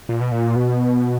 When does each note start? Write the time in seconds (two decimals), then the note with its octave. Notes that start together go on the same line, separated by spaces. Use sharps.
0.09 A#2
0.21 B2
0.32 A#2
0.56 B2